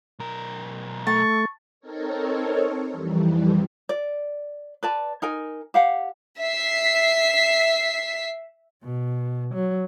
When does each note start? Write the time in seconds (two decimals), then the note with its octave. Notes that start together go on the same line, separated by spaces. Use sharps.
0.19 B1 A#4
1.07 A3 A5 C#6
1.80 C4 D#4 A4 A#4 C#5
2.91 F2 E3 G3
3.89 D5
4.83 B4 D5 A5
5.22 D#4 A#4 G#5
5.74 G4 F5 F#5
6.40 E5 B6 C7
8.84 B2
9.55 F#3